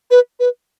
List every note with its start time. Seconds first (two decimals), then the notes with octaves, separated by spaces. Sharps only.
0.11 B4
0.40 B4